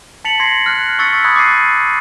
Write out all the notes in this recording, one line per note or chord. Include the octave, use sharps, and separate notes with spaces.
A5 A6 B6 C#7 F7 F#7
C6 G#6 A#6 C7
F6 F#6 A#6
C#6 E6 F#6 A6 B6 C#7
B5 D#6 F#6 G#6
D6 D#6 A6 C7 D#7